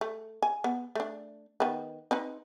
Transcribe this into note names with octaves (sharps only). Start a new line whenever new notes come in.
A3
G#5
B3
A3 D4
D#3 B3
C4 D#4 B4